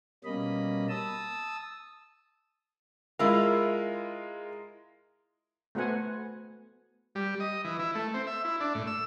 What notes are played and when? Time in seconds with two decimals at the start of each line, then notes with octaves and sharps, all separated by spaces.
0.24 B2 G3 A#3 C#4 D#5 B5
0.89 A5 D#6 E6
3.19 G#3 E4 F4 A#4 F5
5.75 A3 B3 F#4 C5 F#5 G#5
7.15 G3
7.40 D#5
7.65 E3
7.79 E4
7.95 A3
8.14 C4
8.27 E5
8.45 E4
8.60 D4
8.75 A2
8.87 E6